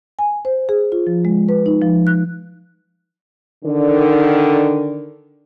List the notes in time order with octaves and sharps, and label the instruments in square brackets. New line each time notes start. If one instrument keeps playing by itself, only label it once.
[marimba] G#5
C5
G#4
F4
F3
G#3
B4
D#4
F3
F#6
[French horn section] D3 D#3